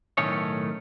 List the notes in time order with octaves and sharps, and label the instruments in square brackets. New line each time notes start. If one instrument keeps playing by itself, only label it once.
[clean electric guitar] B1 A2 D#3 A3 C#4 C#5